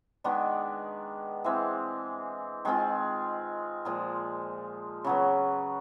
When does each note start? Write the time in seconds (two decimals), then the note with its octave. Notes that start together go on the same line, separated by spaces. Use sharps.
0.24 D#3 G#3 B3 D4
1.44 E3 G#3 C4
2.65 D#3 G#3 C4 F4
3.85 A#2 F3 G#3
5.04 C#3 F#3 B3